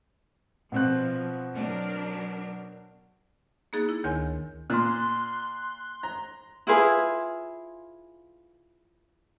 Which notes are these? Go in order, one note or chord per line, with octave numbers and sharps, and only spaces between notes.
B2 F3 C4 F#6
F#3 D4 A#4
A#3 B3 D#4 G#4 F#6 A6
E4
D2 D#3 A#4 C#5 G#5 C6
A#2 C6 F#6
A#5
E4 F4 G#4 B4